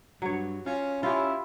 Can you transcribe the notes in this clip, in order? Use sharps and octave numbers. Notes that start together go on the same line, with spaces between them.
G2 F#3 C#5
C#4 F4
C#4 E4 F4 G4